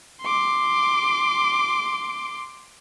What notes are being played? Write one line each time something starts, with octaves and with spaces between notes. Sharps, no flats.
C6 D6